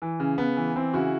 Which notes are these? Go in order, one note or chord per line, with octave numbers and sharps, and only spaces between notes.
E3
C#3
C#3 B3
E3
E3 C4
C#3 E4 F#4